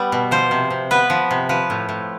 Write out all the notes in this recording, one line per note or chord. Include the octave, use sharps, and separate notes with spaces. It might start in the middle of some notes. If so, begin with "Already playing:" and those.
Already playing: G3 B3
B2
F3 C5
C3
C3
B3 B4
F3
C3
F3 B4
A2
A2